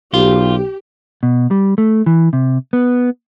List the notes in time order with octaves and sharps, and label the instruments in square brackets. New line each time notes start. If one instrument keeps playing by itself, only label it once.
[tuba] B1 [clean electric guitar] F4 [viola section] G4
[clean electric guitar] B2
G3
A3
E3
C3
B3